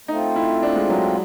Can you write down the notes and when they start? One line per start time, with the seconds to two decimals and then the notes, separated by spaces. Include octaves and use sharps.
0.08 A3 C4 D#4 F4
0.36 E4
0.63 D4
0.76 G#3
0.90 F#3